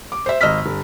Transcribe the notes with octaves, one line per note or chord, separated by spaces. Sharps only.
D6
C5 E5
G#1 D#5 E6 F6 B6
G1